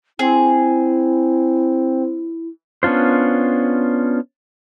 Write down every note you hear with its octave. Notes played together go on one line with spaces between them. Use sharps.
C4 E4 G#4
B3 C#4 D4 F4 C5